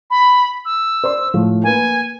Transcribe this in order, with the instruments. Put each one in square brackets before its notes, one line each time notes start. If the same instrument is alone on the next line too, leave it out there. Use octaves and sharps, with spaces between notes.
[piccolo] B5
E6
[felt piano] C5 D5 C6
A2 F3 A3
[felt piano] A#3 A#4 B4 [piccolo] G#5